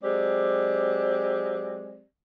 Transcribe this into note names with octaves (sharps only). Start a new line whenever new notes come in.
F#3 G#3 C4 G4 D5